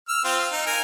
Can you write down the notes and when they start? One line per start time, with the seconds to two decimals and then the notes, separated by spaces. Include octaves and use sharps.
0.09 E6 F6
0.24 C4 F4 C5
0.39 F5
0.52 D#4
0.66 A#4 G#5